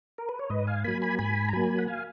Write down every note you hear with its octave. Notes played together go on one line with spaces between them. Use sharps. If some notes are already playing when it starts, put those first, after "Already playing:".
A#4
B4
C#5
G#2 B4 D#5
F5 G#5
F#3 A#3 G#5 B5
G#5 B5
G#2 G#5 B5
A#5
F#3 A#3 G#5 B5
F#5
F5 G#5